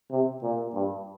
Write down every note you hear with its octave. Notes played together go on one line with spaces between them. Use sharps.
C3
A#2
G2